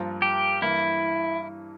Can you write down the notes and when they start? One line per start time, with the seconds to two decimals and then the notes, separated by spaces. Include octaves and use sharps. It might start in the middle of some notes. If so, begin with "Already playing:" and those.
Already playing: G2 F3 A#3 F4 A#4
0.22 G4
0.62 G2 E3 A#3 E4